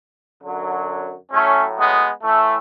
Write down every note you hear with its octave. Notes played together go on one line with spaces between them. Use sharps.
F#2 D3 F#3
A2 F#3 A3 C#4
G#3 B3
A2 E3 A3